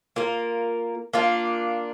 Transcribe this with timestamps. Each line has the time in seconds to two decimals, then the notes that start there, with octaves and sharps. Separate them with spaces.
0.16 A#3 F4 A#4
1.13 A#3 D4 F4